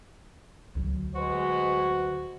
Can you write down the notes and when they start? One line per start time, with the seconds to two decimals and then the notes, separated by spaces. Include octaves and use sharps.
0.75 D2 F#3
1.15 G#3 F#4 B4 C5